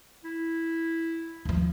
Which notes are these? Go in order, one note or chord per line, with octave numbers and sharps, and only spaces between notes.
E4
D#2 F3